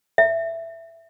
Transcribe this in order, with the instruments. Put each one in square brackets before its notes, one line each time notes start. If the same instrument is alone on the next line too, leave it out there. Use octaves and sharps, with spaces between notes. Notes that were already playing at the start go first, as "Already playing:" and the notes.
[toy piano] E5